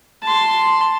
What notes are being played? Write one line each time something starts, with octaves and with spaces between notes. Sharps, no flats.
A5 C6